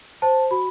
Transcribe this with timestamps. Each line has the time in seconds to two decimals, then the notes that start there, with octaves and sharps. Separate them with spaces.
0.22 C5 A5
0.51 F#4 B5